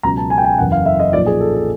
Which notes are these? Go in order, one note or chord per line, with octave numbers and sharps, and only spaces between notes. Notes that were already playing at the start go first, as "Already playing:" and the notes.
C#2 B2 F#3 A#5
A5
G#5
G5
G#5
F#1 E2 C#3 F#5
F5
E5
D#5
B1 A#2 F3 D5
G#4
A4
A4